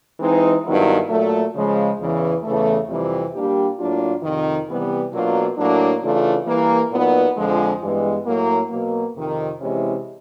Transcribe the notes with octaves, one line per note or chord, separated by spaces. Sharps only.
E3 G#3 C4 D#4
G2 D#3 F#3 B3 E4
A#2 F#3 A3
C#3 F3 G#3
E2 C#3 E3
E2 C#3 E3 A3
F2 C3 E3 G3 C4
A#2 G3 A#3 D4 G4
A2 F#3 A#3 D4 F4
F2 C3 D#3
C3 E3 G3 B3
B2 F#3 A#3 D4 F4
A2 F#3 A#3 D4
C#3 E3 A3 D4 F4
E3 G3 A#3
A#2 F#3 B3 D#4
F2 D3 F3 G#3
G2 E3 G#3 B3
A2 F#3 A#3
B2 F#3 A#3
F2 C3 D#3
C3 E3 G#3 C#4 E4